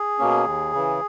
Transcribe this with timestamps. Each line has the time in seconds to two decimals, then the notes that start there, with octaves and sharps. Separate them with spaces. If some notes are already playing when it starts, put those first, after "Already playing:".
Already playing: G#4
0.19 B2 A#3 C#4
0.45 D#2
0.73 C#3 E3